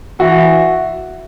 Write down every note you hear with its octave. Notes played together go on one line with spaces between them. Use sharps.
E3 F#4